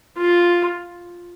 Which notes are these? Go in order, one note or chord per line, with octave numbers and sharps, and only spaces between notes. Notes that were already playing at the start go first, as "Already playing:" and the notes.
F4